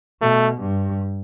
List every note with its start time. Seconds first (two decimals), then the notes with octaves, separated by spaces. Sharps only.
0.21 B2 A3
0.60 G2